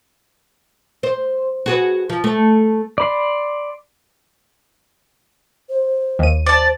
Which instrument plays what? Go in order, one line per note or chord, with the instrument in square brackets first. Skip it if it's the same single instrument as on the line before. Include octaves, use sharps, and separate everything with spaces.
[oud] C5
F#4 G#4 B4
F3
A3
[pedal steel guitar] D5 B5 C6
[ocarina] C5
[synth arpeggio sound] D#2 D#7
[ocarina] C5 [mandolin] D5 A5